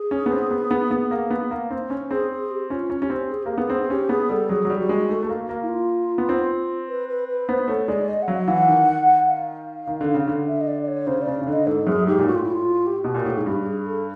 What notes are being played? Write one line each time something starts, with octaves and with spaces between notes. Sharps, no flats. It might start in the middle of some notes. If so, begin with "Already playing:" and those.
Already playing: G#4
C#4
B3
C4
B3
B3
B3
A#3
B3
A#3
C4
C#4
C4 G#4
G#4
G4
C#4 F4
C#4
C#4 G4
C4
G#4
A#3 G4
B3 G#4
C4
G#4
C#4 G4
B3 G#4
G3 A4
F#3 G#4
F#3
G3
F#4
G#3
A3
A3
A#3
A#3
E4
F4
B3
C4
B4
B4
B4
B3 C5
A3 C#5
G#3 D5
D#5
F#5
F#3 F5
E3 F#5
D#3
F5
D#3
D3
C#3
D3
E5
D#5
D5
D5
C#5
C#3 C5
D5
C#3
C#3
D3 D#5
G#2 A4
F#2 G#4
G#2 G4
A#2
A2 F#4
F4
E4
F4
G4
B2
A#2
A2
G#2 G#4
G2 G4
G4
G#4
A4